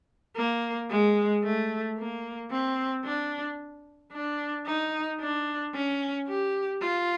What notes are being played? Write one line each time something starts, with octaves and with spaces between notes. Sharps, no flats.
A#3
G#3
A3
A#3
C4
D4
D4
D#4
D4
C#4
G4
F4